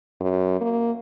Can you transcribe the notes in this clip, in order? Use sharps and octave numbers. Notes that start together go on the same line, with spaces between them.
F#2
A#3